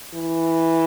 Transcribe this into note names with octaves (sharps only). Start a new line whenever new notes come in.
E3